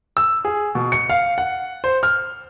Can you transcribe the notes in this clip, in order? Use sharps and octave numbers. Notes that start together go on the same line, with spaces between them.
E6
G#4
B2
C#7
F5
F#5
C5
F6